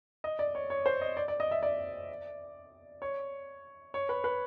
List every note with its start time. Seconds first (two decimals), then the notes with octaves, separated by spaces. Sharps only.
0.24 D#5
0.39 D5
0.55 C#5
0.70 C#5
0.86 C5
1.01 D#5
1.17 D5
1.28 D5
1.40 D#5
1.51 E5
1.63 D5
3.02 C#5
3.94 C#5
4.09 B4
4.24 B4